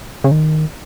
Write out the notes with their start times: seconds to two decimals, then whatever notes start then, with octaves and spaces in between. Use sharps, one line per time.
0.24 C#3
0.31 D#3